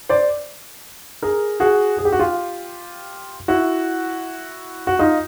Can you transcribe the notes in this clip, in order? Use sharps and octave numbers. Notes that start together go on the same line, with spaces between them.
C5 D5
G#4 A#4
F#4 G#4
G#4
G4
F#4
F4 G4
E4 F#4
F#4
D#4 F4